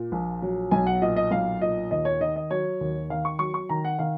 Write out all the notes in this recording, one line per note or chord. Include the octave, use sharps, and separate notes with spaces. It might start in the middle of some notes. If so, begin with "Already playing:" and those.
Already playing: A#2
A#1
F#3
B1 G#5
F#5
A#2 D#5
D#5
B1 F5
A#2 D#5
D#2 D#5
C#5
D#3 D#5
D#5
F#3 C#5
D#2
D#3 F5
C#6
F#3 C#6
C#6
D#3 A#5
F#5
D#3 F5